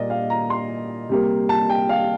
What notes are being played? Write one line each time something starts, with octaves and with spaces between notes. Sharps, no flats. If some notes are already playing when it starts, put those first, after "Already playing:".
Already playing: A#2 G3 A#3 D5 D#5
F5
A#5
C6
C3 G3 A#3
A5
G5
F5